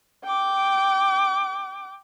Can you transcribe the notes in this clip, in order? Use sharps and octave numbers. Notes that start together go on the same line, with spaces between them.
G5 D6